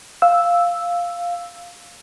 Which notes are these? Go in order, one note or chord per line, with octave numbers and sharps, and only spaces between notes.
F5 E6